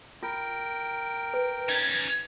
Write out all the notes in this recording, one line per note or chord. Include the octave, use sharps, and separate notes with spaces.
F4 A#4 G5
B4
C#4 D#4 G#6 A6